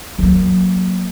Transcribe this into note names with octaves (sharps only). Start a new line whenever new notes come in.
F#3 A#3